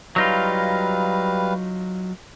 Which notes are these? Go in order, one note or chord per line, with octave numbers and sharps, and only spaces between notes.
F#3 G3 D#4 F4 B4 F5